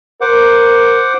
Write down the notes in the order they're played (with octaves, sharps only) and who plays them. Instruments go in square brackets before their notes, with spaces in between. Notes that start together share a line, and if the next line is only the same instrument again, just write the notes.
[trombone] A#4 [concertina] C5 F#5 D6